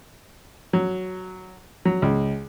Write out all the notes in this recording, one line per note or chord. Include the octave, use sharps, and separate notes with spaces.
F#3
F#3
C#2